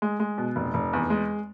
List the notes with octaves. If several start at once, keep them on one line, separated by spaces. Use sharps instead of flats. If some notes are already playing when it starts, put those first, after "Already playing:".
G#3
G#3
B2
F1
F1
E2
G#3